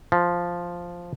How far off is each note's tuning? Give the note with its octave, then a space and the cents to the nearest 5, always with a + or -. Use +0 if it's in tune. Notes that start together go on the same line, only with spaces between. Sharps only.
F3 +0